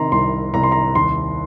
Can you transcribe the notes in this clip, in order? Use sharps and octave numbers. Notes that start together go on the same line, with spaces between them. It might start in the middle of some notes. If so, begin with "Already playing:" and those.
Already playing: C3 D#3 A#5 C6
C2 C6
C2 A#5
C6
A#5
D#2 C6